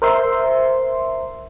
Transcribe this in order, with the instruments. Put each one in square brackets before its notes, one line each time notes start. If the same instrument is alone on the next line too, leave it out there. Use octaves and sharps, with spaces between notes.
[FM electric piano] A#4 C5 E5 C6